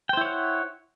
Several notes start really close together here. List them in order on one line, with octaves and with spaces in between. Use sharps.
G5 C5 E4 C#5 F#5